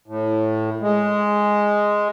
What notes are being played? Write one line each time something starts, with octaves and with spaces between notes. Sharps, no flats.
A2
G#3